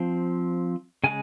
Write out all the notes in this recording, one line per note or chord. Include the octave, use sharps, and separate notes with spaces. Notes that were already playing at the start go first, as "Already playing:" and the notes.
Already playing: F3 C4
C#3 G#3 G#5